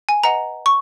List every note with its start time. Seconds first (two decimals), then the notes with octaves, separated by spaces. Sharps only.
0.09 G#5
0.23 B4 D#5 F#5 A#5
0.66 C#6